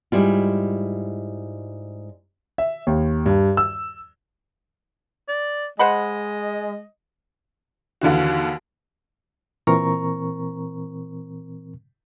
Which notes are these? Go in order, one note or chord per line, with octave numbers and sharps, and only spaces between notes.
G#2 G3 E4 F4
E5
D#2
G2
E6
D5
G#3 C5 D#5 F#5 B5
D#2 D3 E3 F#4
A#2 E3 C4 A#4 A#5 C#6